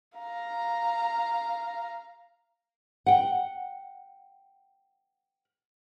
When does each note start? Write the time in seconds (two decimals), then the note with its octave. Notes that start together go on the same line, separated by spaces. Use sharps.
0.18 F5 A#5
3.06 F#5 G5